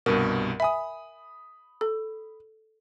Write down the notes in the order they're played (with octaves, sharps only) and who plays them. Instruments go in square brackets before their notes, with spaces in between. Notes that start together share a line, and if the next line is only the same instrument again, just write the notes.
[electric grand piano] C2 G2 B2 [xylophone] A#4
[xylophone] E5 G#5 [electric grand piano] B5 D#6
[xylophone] A4